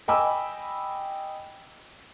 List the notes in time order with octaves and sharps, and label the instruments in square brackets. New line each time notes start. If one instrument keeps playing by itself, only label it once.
[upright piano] D#5 G5 G#5 B5 D6 E6